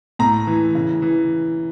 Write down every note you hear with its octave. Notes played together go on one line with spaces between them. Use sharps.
A2 A#5
E3
C#3
E3